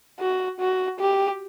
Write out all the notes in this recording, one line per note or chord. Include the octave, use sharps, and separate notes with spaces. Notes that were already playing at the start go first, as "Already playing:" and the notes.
F#4
F#4
G4